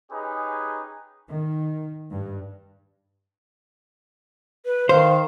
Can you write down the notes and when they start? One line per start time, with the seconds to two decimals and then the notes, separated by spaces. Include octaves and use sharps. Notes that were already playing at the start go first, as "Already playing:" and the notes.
0.11 C#4 D#4 G4 G#4 B4 C#5
1.28 D#3
2.11 G2
4.65 B4
4.89 D#3 C5 F5